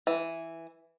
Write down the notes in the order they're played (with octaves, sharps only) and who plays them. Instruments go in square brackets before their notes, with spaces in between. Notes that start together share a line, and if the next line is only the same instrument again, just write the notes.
[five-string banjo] E3